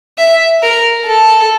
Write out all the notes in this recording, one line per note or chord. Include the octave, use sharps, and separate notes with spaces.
E5
A#4
A4